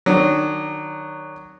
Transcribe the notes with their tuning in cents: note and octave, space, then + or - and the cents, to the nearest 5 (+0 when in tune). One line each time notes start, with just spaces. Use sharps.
D#3 -25 F#3 +0 D4 -10